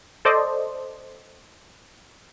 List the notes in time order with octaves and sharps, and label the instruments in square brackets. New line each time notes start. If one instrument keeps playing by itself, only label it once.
[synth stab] A4 C5 D5 D#5